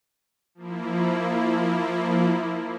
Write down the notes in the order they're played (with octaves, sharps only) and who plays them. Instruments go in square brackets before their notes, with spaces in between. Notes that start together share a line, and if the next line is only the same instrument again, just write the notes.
[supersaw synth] F3 A#3 E4